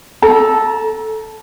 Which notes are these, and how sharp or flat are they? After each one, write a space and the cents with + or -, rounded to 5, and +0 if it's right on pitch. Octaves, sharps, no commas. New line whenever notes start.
A4 -5 A#5 +25